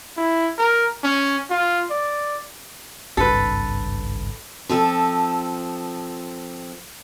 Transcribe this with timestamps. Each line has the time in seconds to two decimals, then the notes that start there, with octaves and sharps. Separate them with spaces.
0.17 E4
0.58 A#4
1.04 C#4
1.50 F4
1.90 D5
3.17 G#1 C#2 G2 A4 B4
4.69 F3 C4 A4